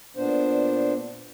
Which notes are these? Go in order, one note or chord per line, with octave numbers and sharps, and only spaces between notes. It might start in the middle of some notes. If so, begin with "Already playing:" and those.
A#2 B3 D4 C5